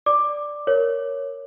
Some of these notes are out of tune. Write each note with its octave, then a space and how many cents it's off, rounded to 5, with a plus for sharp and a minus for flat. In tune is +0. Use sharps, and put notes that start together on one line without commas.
D5 +0 D6 +10
A#4 +0 C#5 +0